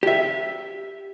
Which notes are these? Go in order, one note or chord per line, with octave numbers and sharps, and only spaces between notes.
G4 E5